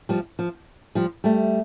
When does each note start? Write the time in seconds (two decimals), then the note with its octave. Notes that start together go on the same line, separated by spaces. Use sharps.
0.09 F3 G3
0.39 F3
0.95 F3 G3
1.24 G3 A3